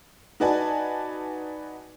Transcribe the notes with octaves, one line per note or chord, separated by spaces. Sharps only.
D#4 F#4 B4 D5 G#5 A5